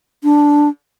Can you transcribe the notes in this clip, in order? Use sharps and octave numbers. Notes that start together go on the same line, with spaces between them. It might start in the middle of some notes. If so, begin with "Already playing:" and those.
D4